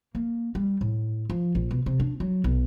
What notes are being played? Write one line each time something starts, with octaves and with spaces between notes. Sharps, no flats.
A#3
G3
A2
F3
A#1
B2
C3
D4
F#3
B1